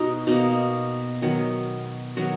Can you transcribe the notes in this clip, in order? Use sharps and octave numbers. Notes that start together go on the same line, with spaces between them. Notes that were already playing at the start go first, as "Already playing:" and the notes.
Already playing: B2 D#4
B2 A#3 D#4
D#3 F#3 B3
D#3 F#3 B3 F#4